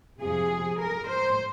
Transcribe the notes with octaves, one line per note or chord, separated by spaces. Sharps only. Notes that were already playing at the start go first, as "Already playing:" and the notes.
F2 C3 F3 G#4
A#4
C5